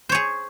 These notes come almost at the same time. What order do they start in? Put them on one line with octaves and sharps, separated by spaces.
C5 C#5 G#4